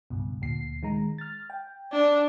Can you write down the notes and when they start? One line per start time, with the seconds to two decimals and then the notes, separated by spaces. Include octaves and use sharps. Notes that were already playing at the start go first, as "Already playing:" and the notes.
0.10 C#2 G2 B2
0.42 D2 A#2 C7
0.83 D#3 G#3 A#5
1.18 F6 A6
1.50 G5
1.92 D4